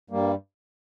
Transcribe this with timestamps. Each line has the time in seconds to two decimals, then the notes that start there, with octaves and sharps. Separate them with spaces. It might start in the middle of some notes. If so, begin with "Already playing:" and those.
0.10 G2 G3 A#3